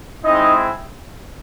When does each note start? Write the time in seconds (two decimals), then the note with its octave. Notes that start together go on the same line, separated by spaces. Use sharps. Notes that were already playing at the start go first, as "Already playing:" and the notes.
0.24 G#3 C4 D#4 E4 D#5